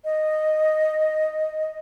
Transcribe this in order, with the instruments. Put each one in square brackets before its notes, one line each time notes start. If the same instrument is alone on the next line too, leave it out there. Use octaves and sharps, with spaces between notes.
[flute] D#5